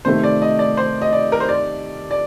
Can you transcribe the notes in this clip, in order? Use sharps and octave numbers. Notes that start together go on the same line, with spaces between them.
C3 D#3 A3 C5
D5
D#5
D5
C5
D#5
D5
A#4
C5
D5
D5